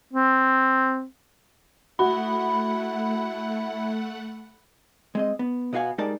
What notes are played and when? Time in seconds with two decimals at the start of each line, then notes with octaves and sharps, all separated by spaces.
0.13 C4
1.99 A3 E4 F#4 F#5 B5
5.15 G#3 C4 D#5
5.39 B3
5.73 B2 B3 F#4 F5 G#5
5.98 G3 G#3 D#4 A#4 D5 A5